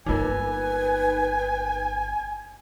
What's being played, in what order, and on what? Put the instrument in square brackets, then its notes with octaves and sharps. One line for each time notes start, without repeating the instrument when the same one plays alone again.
[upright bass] G1 A#3 [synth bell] D#4 F4 A#4 [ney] B4 [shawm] G#5